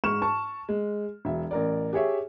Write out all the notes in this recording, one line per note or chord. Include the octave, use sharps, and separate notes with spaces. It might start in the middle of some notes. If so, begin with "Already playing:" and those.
G#2 C#6 F6 E7
A5 C#6
G#3
E1 E5
A1 A#4 D5
G4 G#4 C#5 E5